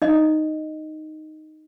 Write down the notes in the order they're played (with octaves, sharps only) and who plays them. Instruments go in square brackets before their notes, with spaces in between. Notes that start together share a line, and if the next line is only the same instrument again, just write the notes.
[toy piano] D#4 D#5